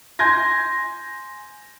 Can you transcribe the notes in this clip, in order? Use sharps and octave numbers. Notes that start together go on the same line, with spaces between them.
G#5 C6 G6 G#6 A#6